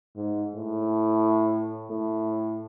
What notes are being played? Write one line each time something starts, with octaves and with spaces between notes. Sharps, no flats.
G#2
A2
A2